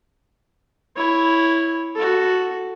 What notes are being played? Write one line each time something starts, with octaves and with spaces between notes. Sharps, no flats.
E4 C#5
F#4 A4